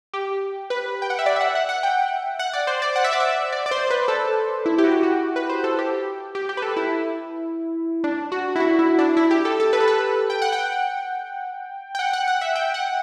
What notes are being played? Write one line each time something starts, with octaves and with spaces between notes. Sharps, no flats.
G4
B4
G5
F#5
E5
D5
E5
F#5
F#5
F#5
G5
F#5
D5
C5
D5
F#5
E5
D5
E5
D5
D5
C5
B4
A4
E4
G4
F#4
F#4
B4
C5
A4
G4
G4
G4
B4
A4
E4
D4
F#4
E4
F#4
E4
D4
E4
G4
A4
A4
B4
A4
B4
G5
F#5
G5
G5
F#5
F#5
F#5
E5
G5
F#5